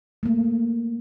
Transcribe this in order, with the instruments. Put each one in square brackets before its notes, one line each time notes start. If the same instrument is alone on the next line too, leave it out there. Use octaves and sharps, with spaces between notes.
[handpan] A3 A#3